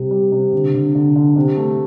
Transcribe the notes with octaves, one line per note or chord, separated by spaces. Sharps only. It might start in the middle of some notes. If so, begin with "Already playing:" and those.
Already playing: C3 G3
G3
C3
D3
D3
D3
D3
C3
A3